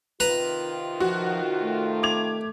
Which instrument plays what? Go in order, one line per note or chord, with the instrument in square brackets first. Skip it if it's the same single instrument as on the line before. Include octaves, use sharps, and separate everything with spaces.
[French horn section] C3 D#3 F4 [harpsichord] B4 A#5
[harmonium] F3 [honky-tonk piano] F#4
[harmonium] A3
[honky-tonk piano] D6 G#6 F7